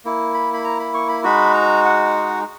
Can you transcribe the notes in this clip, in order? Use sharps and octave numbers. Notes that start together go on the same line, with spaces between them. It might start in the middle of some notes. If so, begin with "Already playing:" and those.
A#3 E4
B5
B5
A#5
B5
C#6
B5
G#3 D#4 F#4 B5
A#5
F#5